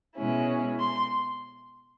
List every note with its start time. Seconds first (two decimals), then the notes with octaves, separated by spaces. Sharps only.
0.16 B2 G#3 C#4 E4
0.79 C6